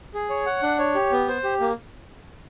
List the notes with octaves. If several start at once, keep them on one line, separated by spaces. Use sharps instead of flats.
G#4
C#5
F#5
D4
C#5
G4
B3
C5
G4
A#3